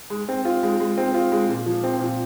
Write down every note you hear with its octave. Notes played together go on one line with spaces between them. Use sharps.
G#3
C4
F4
G#3
G#3
C4
F4
G#3
A#2
F3
C4
A#2